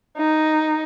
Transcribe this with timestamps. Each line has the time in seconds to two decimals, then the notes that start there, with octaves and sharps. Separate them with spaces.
0.18 D#4